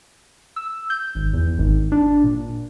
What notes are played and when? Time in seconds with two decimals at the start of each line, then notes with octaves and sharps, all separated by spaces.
0.56 E6
0.90 G6
1.15 G#1
1.33 E2
1.58 G#1
1.92 D4
2.24 A#2